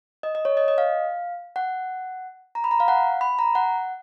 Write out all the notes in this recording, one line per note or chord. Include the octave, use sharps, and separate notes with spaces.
D#5
D#5
C#5
D#5
D#5
F5
F#5
A#5
B5
A#5
F5
F#5
B5
A#5
F#5